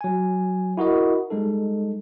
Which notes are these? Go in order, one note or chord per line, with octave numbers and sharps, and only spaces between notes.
F#3 G#5
E4 F#4 A#4 D#5
G3 G#3 D#4 A4